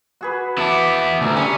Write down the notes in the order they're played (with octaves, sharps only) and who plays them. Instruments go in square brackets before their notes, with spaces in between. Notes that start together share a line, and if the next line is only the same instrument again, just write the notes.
[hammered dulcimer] F#4 G#4 B4
[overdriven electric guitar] B3 E4 [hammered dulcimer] G5 A5 D6
[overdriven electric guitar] D2 [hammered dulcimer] G#4 A#5
[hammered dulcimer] G3 E5 G#5 [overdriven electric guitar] C#4